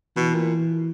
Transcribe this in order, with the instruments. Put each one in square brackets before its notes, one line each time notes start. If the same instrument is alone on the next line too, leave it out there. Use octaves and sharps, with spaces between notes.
[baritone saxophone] B2 [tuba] E3
[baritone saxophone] A#2